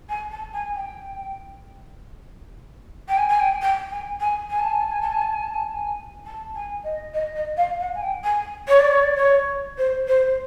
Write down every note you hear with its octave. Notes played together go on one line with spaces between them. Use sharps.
G#5
A5
G#5
G5
G5
G#5
G#5
G5
G5
G#5
G#5
G#5
A5
G#5
A5
G#5
A5
G#5
A5
G#5
A5
G#5
A5
G#5
A5
G#5
D#5
D#5
D#5
F5
F#5
G#5
G5
G#5
C#5
D5
C#5
D5
C#5
C5
C5